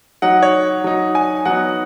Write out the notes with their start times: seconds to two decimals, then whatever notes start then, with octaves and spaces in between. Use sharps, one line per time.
0.22 F#3 D#4 F#5
0.43 C#5
0.84 F#3 D#4
1.15 G#5
1.45 F#3 B3 D#4 F#5